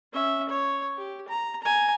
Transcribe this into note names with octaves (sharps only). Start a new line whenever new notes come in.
C#4 E5
C#5
G4
A#5
G#5 A#5